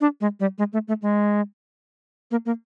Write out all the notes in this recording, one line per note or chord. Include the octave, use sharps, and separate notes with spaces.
D4
G#3
G3
G#3
A3
A3
G#3
A#3
A#3